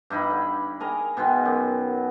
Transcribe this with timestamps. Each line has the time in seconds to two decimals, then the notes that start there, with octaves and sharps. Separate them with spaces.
0.10 G2 D#4 E4 B5
0.30 D3
0.80 G#4 A#4 D#5 A#5
1.17 B2 D#3 G#3 B3
1.45 F#2